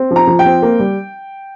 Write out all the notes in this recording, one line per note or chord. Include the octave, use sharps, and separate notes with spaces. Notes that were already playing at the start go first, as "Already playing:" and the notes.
Already playing: C4
F3
A#5
F3
G5
C4
A#3
G3